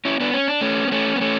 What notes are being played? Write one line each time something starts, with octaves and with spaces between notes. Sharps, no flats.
C#4 E4
B3 D4
C#4
D4
A3 C#4
B3
A3 C#4
B3
A3 C#4